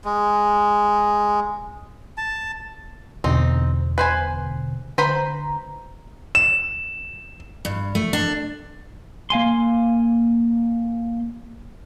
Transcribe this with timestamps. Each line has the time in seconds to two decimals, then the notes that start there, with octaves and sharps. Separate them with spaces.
0.05 G#3
2.18 A5
3.24 E2 B2 D3 C4 D#4
3.98 B4 C5 G#5
4.98 D3 B4 C5 A#5 B5
6.35 E7
7.65 G2
7.95 A3
8.13 D4
9.30 A#3 F5 G#5 C6